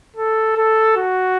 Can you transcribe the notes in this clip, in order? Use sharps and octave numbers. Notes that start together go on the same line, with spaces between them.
A4
A4
F#4